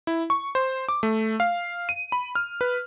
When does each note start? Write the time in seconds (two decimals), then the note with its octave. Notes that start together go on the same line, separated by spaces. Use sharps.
0.07 E4
0.30 C#6
0.55 C5
0.89 D6
1.03 A3
1.40 F5
1.89 D#7
2.12 B5
2.35 F6
2.61 B4